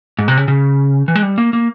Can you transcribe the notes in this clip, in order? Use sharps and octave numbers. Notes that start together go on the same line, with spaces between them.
G#2
C3
C#3
C#3
E3
G#3
G3
A#3
A#3